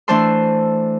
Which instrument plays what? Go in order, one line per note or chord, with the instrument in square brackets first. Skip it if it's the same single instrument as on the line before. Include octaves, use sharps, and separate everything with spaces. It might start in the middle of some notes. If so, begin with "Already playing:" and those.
[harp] E3 A3 D4 C5 A5 C6